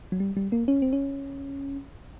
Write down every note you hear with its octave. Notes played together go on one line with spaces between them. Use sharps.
F#3
G3
G3
A#3
C#4
C4
C#4